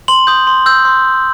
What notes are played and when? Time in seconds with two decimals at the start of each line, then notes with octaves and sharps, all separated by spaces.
0.08 C6 F#7
0.27 D#6 G6
0.47 C6
0.66 E6 G6
0.85 C6